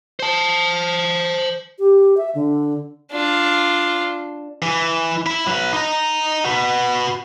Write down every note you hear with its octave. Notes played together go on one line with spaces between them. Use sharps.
C5 A5
G4
E5
D3
D4 F4
E3
E4
F#3 B4
D#4 A#5
F#4 B4